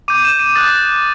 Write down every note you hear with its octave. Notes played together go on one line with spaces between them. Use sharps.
D6 G6 D#7
E7
D#7
D#6 F#6 A6